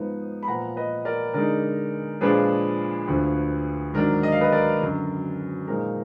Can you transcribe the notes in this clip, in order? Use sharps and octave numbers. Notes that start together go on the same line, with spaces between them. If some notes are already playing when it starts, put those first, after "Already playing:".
Already playing: G#2 F3 B3 D#4
B5
A#2 F3 B3 F#5 A#5
B4 D#5
A#4 D5
D3 G#3 D#4 A#4 D5
A#2 F3 G#3 D4 G#4 B4
D2 D3 F3
G#2 D#3 F#3 D4 A#4
D#5
F5
B4 D#5
A#4 D5
F#2 D3 F#3
A#2 F3 G#3 D#4 A#4